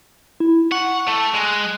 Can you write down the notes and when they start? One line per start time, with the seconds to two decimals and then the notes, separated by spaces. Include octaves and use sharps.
0.40 E4
0.72 F#5 C#6
1.07 A3
1.34 G#3 F#6